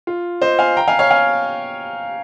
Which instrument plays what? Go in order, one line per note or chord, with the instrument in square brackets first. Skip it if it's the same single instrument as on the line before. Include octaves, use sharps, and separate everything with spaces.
[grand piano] F4
C5 D#5
F5 G#5
G5 A#5
F5 G#5
C#5 F5
F5 G#5